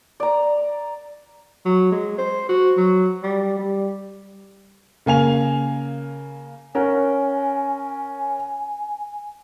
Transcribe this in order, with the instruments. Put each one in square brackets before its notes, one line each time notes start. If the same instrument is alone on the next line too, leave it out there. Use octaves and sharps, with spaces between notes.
[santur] D5 A#5
[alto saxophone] F#3
G#3
C5
F#4
F#3
G3
G3
[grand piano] C#3 A#3 G#5 F7
[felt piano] C#4 A#4 F#5 [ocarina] G#5